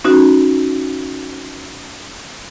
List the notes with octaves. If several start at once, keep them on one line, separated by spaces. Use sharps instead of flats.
C#4 D#4 F#4